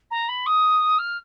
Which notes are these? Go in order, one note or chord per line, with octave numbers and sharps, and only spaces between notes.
A#5
B5
D#6
F6